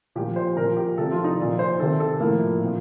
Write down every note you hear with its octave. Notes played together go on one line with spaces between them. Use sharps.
A#2 F3 G4
C5
A#2 F3 A#4
G4
C3 F3 A4
F4
D#4
A#2 F3 D5
C5
C3 D#3 A4
A4
A2 F3 A#3
A#2 F3